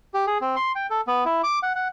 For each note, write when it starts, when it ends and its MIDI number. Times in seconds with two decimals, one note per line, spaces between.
0.14 0.26 67
0.27 0.38 68
0.41 0.56 60
0.56 0.72 84
0.75 0.87 79
0.90 1.01 69
1.07 1.24 59
1.26 1.41 64
1.43 1.59 86
1.63 1.73 78
1.75 1.88 78